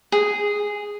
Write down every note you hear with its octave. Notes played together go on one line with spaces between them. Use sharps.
G#4